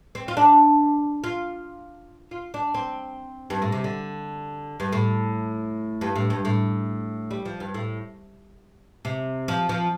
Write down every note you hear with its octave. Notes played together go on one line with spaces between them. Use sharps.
C4
F4
D4
F4
F4
D4
C4
G2
A2
C3
D3
G2
A2
G2
A2
G2
A2
G3
F3
G2
A2
C3
F3
F3